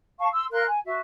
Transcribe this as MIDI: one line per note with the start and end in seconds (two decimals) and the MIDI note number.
0.19 0.27 77
0.19 0.27 81
0.19 0.27 85
0.32 0.45 84
0.32 0.45 88
0.52 0.65 70
0.52 0.65 77
0.52 0.65 84
0.52 0.65 90
0.66 0.78 80
0.85 1.00 66
0.85 1.00 76